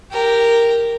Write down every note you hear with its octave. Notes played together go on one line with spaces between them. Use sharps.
G4 A#4